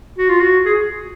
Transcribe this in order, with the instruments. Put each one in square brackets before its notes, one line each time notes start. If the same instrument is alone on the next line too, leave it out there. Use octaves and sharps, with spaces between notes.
[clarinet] F#4
F4
F#4
G#4